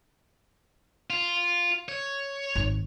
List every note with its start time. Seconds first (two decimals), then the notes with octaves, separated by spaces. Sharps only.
1.10 F4
1.89 C#5
2.55 G#1